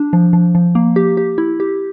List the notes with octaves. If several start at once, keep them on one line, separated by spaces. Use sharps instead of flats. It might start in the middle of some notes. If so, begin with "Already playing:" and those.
Already playing: D4
F3
F3
F3
A#3
G4
G4
E4
G4